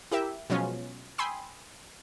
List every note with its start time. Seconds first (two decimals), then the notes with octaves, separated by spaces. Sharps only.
0.12 E4 G4 A#4 E5
0.50 B2 F3 F#3 G#3 C#4 F4
1.18 G5 G#5 B5 C6 D#6 E6